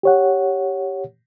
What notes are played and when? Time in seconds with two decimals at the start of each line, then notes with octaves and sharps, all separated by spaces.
0.03 G4 C#5 F#5